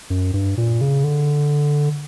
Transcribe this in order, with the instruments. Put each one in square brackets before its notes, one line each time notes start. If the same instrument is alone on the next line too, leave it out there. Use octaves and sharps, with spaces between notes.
[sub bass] F#2
G2
A#2
C#3
D3